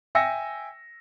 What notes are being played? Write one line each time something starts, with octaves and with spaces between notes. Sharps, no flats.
E5 G5 G#5 E6 A#6 C#7